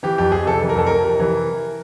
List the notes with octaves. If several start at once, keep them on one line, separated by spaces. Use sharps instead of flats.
E3 G4
F2 G4
F2 G#4
C3 A4
E3
A#4
F2 A4
F2 A#4
C3
E3